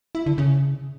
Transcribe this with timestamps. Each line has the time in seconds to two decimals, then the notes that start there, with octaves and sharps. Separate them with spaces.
0.15 E4
0.26 D3
0.38 C#3